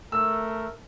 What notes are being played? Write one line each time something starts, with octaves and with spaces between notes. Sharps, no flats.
A3 A#4 E6